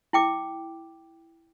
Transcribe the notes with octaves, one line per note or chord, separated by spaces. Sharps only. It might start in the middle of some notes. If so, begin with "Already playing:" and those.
E4 G5 D6